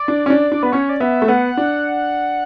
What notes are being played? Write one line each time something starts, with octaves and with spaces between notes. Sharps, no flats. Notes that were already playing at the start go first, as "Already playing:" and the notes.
Already playing: D5
D4
C#4
D4
D4
B3 B4
C#4 C#5
D5
B3 E5
A3
B3 F#5
D4